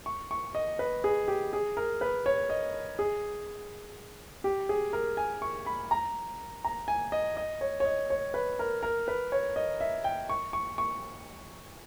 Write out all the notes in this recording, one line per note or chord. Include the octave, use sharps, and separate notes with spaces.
C#6
C#6
D#5
B4
G#4
G4
G#4
A#4
B4
C#5
D#5
G#4
G4
G#4
A#4
G#5
C#6
B5
A#5
A#5
G#5
D#5
D#5
C#5
C#5
D#5
C#5
B4
A#4
A#4
B4
C#5
D#5
E5
G5
C#6
C#6
C#6